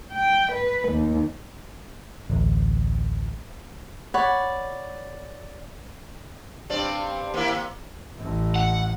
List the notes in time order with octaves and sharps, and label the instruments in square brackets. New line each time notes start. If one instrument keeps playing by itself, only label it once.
[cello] G5
B4
D#2
[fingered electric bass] A1 D2
[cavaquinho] C#5 D5 F#5 B5
[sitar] G2 C4 D5
A#3 C4 E4
A#3
[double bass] A1 A2
[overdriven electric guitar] F#5